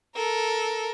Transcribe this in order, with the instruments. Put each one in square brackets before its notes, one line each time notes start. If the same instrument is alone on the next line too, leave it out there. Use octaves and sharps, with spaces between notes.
[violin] A4 A#4